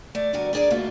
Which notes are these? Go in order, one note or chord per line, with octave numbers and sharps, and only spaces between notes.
A3 D5
E2 G2 D3 F#4 A#4 G#5
D4 E4 G#4 A#4 D5
G#2 D3 A3 A#3 F4 F#4